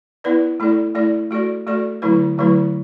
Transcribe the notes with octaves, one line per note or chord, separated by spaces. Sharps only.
B3 E4 B4 D5
A3 E4 A4 D5
A3 E4 A4 D5
A3 F#4 A4 D5
A3 F#4 A4 D5
D3 F#3 A3 E4 B4
D3 F#3 A3 E4 B4